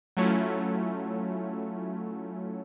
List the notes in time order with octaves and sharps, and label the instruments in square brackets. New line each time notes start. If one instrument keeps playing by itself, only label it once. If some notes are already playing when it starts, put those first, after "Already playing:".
[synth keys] F#3 A3 C#4 E4 F4